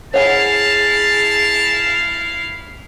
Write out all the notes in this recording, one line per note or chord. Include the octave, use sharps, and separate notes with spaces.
E4 G#4 C#5 F5 F#5 G#5 A5